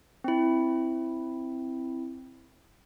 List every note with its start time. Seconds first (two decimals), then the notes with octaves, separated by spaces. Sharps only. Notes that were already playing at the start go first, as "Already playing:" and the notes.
0.24 C4 E4